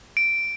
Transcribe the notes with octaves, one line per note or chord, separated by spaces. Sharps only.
D7